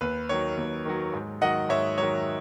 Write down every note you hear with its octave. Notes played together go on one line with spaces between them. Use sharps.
D#2 B4
D#3 F#3 C#5
D#2
D#3 F#3
G#2
D#3 F#3 D#5 F#5
G#2 C#5 E5
D#3 F#3 C#5